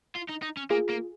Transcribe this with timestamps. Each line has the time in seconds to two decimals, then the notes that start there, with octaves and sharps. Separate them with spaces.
0.16 F4
0.29 D#4
0.43 D#4
0.57 C#4
0.70 A#3 F4 G#4
0.89 A#3